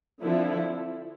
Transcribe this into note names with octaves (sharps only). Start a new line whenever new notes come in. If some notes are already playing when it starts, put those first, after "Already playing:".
D3 F3 C4 E4 A4